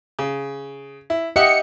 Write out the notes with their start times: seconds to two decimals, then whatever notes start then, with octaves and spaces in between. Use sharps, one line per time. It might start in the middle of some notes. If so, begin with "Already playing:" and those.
0.19 C#3
1.10 E4
1.36 G4 D#5 E5 F#5 C#7